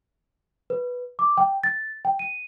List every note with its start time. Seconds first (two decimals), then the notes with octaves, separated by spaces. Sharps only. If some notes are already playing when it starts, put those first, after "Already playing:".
0.70 B4
1.19 D6
1.37 G5
1.64 A6
2.05 G5
2.19 D#7